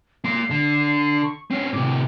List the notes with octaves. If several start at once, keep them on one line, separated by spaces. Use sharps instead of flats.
A#3 C6 C7
D3
C#6
C4 C#4 C7
A2 C3 D6